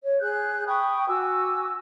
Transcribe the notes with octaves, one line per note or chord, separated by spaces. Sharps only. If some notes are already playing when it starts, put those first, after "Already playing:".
C#5
G#4 F#6 G6
G5 B5 C#6 D#6
F#4 G#5 D6 E6